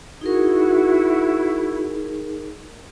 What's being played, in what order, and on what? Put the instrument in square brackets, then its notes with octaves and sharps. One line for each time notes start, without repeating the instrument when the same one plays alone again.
[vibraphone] D#4 G#4 A#4 [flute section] E4 F#4 G#6